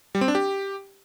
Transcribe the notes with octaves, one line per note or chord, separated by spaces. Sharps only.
G3
C4
D4
G4